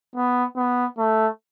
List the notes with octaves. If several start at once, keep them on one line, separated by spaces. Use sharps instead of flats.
B3
B3
A3